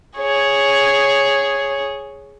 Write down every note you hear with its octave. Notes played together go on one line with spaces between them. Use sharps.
G#4 C#5